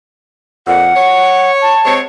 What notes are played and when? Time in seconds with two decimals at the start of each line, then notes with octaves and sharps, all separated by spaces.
0.67 F2 A#2 F#5
0.96 C#5
1.62 A5
1.85 G#3 C4 C#5